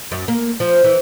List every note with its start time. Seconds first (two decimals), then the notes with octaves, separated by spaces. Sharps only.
0.12 F#2
0.28 A#3
0.60 F3
0.84 E3